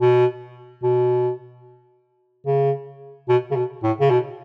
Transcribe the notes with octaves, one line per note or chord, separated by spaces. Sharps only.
B2
B2
C#3
B2
C#3
B2
A2
C#3
B2